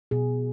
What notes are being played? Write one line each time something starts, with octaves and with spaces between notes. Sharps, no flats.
B2 G#4